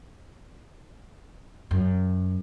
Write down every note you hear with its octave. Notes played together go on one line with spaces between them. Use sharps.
F#2